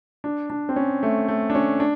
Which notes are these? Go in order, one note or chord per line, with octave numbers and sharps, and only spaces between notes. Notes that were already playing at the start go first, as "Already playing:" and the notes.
D4
D4
C4
C#4
A3
A3
D4
C#4
D4